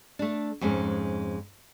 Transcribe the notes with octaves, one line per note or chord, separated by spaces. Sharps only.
A3 D4
F2 G#2 G#3 C#4